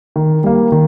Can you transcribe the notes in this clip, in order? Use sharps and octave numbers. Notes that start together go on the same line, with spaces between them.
D#3
G3 A#3
D#3